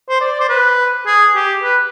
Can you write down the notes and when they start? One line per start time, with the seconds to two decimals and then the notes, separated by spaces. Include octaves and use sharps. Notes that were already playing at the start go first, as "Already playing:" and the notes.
0.09 C5
0.21 D5
0.40 C5
0.49 B4
1.07 G#4
1.35 G4
1.63 B4